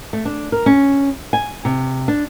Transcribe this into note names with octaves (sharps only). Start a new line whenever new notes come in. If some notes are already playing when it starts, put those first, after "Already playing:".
A3
D4
A#4
C#4
G#5
C3
D4